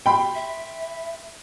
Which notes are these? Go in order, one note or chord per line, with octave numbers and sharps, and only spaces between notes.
G5 B5 C6
E5